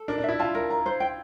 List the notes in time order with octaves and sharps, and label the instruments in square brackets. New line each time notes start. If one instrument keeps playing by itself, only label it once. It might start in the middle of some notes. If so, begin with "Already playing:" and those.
Already playing: [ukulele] A4
[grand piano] D4 [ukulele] A#4
[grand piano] D4
[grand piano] E4 [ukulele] E5
[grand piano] F4 [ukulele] A5
[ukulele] A#4
A#5
C5
G5